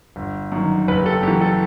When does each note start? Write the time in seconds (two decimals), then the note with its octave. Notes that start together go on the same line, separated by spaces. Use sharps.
0.16 G1
0.52 F#2 D#3
0.88 F#1 B4
1.01 G4
1.06 A4
1.23 F#2 G4
1.28 E3
1.41 A4